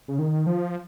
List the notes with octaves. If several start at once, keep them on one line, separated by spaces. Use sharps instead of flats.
C#3
D#3
F3